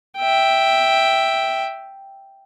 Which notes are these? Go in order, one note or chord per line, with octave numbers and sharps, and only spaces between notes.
E5 G5